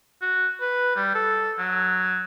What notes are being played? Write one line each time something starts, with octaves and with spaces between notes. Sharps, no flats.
F#4
B4
G3
A4
F#3